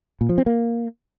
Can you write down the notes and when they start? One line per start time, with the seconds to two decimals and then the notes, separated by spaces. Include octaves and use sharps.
0.21 A#2
0.29 F3
0.38 C4
0.46 A#3